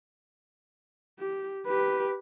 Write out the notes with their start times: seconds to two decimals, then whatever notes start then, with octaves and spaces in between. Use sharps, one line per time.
1.19 G4
1.66 G4 B4